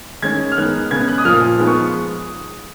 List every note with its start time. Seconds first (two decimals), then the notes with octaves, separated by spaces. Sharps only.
0.22 D#3 G#3 C#4 G#6
0.52 F6
0.57 D#3 G#3 B3 D#4 F#6
0.91 C#3 G#3 B3 G#6
1.08 F#6
1.18 D#6
1.25 A#2 F3 A#3 F6
1.58 F3 G#3 B3 D#4
1.67 C#6